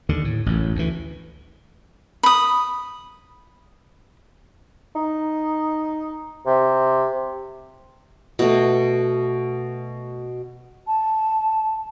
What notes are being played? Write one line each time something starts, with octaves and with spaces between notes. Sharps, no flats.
D#2 D3
A2
A1 F#2
D2 E3
B5 D#6
D#4
C3
B2 A3
A5